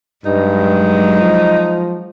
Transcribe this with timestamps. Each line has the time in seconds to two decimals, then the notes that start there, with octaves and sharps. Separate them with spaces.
0.25 G2 F#3 G#3 D#4
1.21 F3